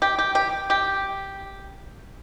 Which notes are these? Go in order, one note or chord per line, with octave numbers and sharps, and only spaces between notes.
G4
G4
G4
G4